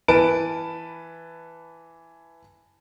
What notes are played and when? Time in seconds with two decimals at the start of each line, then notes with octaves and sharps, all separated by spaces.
0.08 E3 B4 A5 D7